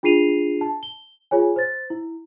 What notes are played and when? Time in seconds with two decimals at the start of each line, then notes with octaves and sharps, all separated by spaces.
0.03 D4 F4 G#4 C7 D#7 F7
0.61 A5
0.83 G7
1.31 F4 G#4 C#5 G#5
1.56 C5 A6
1.90 E4